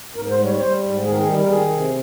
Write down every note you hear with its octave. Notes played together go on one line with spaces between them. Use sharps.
G#2 A#4
C5
G3
C#5
C#5
G3 C5
G#2
D#3 G#4
A#4
G#4
G3
A#4
D#3 G#4
C3